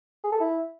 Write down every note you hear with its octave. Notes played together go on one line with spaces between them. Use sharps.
G#4
A4
E4